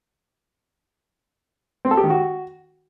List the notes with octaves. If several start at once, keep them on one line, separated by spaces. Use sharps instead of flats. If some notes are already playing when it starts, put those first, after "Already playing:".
C4
A4
G4
D#3
F#4